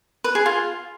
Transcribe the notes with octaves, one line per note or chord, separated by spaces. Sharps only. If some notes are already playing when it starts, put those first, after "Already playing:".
B4
G#4
F4